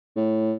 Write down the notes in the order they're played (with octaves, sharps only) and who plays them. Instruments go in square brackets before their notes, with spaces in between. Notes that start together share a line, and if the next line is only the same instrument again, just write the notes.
[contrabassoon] A2